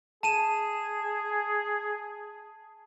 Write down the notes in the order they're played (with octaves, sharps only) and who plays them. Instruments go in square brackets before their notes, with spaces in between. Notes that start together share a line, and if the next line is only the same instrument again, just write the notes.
[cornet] G#4 [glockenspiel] A5 D#7 E7